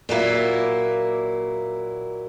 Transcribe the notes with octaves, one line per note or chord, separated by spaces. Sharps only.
A#2 F#3 A#3 E4